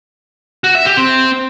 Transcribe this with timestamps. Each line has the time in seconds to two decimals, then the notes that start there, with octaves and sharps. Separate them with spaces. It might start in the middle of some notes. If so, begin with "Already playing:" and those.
0.64 F#4
0.75 E5
0.86 G4
0.97 C4